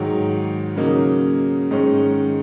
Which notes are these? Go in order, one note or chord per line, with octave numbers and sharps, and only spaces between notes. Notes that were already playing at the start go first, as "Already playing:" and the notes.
Already playing: G#2 D#3 F#3
C#3 F#3 A#3 D#4
G#2 D#3 G#3 C#4